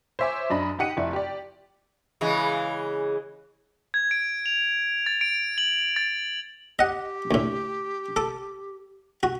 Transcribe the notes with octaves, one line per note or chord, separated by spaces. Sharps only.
C5 C#5 E5 G#5 D6
F#2 D4 D#5 B5
D#4 G4 F#5 C#7 D#7
F1 E4 D5
G4 D5
C#3 E3 G#3
G#6
D7
F7
A6
D7
F#7
A6
G4 D#5 F#5
D2 A2
A4 D6
F#4